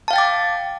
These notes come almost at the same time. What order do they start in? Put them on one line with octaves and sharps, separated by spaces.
A5 F5 G5 A6 D6